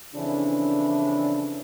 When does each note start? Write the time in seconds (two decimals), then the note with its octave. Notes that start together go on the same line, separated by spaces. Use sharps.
0.15 F2 C#3 E3 D4